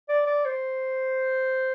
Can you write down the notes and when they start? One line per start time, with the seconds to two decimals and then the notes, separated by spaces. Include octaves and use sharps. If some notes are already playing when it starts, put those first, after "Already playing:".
0.09 D5
0.26 D5
0.45 C5